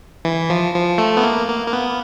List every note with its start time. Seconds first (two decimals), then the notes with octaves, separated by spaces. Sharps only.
0.25 E3
0.50 F3
0.74 F3
0.98 A3
1.17 B3
1.23 A#3
1.48 A#3
1.67 A#3
1.73 B3